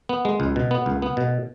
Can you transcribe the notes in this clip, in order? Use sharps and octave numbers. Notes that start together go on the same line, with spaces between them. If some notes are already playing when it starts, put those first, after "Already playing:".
B3
G#3
C#2
B2
B3
C#2
B3
B2